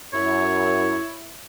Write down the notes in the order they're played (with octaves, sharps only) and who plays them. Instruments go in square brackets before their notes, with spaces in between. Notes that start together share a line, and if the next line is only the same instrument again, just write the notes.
[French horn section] F#2 [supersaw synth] E4 [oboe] C#5